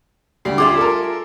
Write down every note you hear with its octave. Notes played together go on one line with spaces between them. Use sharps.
D2 G3 C7
F4 G#4 E5 D6
A4 A#4